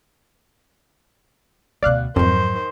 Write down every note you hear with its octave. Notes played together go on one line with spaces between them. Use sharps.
D2 B2 D5 F5 F#6
F2 G#2 D#3 F#3 C5